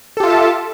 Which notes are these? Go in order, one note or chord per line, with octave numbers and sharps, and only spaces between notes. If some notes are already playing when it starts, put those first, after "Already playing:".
F4 G4 A4 E5 A5